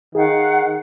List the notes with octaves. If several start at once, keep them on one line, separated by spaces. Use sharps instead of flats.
D#3 G#4 F5 F#5